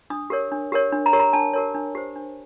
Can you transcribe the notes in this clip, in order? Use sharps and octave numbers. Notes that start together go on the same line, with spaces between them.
D4 D#6
G4 A#4 C#5
D4
G4 A#4 C#5
D4
A#5
G4 A#4 C#5
A#5
D4 A5
G4 A#4 C#5
D4
G4 C5
D4